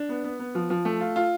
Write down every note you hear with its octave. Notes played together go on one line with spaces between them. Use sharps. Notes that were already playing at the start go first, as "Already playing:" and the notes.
Already playing: D4
B3
B3
B3
F3
F3
A3
F4
F4